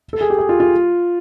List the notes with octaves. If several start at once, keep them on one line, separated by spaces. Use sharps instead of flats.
A4
G#4
G4
G#4
F4
F4